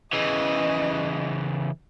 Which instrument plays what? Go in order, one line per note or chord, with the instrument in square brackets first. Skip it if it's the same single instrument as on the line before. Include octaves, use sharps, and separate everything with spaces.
[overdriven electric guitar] C#3 E3 [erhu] D#5